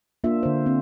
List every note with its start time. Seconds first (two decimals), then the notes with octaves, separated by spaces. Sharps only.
0.24 A#3 D4 F4 E5
0.43 D3 C5
0.66 C4